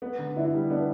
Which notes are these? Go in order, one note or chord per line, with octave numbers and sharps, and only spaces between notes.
B3
D3
D4 E4
G3
B3 D4